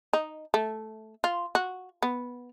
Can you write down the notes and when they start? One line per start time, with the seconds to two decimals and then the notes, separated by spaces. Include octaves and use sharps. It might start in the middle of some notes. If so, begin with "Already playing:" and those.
0.13 D#4
0.54 A3
1.24 F4
1.55 F#4
2.03 B3